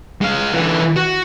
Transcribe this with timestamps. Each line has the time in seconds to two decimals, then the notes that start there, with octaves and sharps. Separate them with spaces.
0.21 G#3 F5
0.54 D3 E3
0.96 F#4